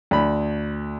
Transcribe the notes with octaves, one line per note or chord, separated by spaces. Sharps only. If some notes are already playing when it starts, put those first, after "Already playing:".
D2 B5